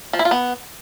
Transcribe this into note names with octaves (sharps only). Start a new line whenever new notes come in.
F3
E4
F4
B3